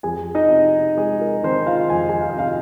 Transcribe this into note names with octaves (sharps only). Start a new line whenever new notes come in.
F2 G#4 G#5
D#4 D#5
C3
G#3 G#4
A#4
D#3 C4 C5
F4 F5
F2 G#5
G#4 G#5
F5
D#5
C3 F4 F5